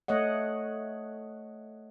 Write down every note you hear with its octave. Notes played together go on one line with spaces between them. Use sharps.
A3 C#5 D#5 F#5